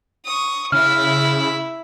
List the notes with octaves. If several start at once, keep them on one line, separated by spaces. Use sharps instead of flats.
C#6 D#6
C#3 E4 E5 F6